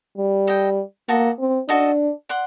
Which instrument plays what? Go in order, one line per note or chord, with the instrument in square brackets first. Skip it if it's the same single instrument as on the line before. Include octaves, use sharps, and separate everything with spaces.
[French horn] G3
[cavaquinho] A4 D#5 G5
[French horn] A#3 [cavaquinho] F#4 A4 D#5 A5
[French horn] C4
[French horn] D4 [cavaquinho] F#4 A4 D#5 A5
[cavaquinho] D5 F#5 C6